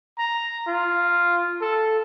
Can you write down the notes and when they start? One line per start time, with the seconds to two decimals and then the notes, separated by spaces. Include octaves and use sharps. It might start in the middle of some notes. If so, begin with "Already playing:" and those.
0.18 A#5
0.67 F4
1.61 A4